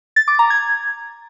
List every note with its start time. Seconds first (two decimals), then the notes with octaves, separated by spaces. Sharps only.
0.16 A6
0.28 D6
0.39 A#5
0.50 G#6